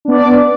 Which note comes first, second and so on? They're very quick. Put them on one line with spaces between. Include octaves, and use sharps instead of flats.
D4 B3 D5